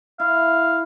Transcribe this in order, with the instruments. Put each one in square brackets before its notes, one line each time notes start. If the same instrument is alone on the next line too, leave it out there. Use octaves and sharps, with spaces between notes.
[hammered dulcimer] E4 [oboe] F5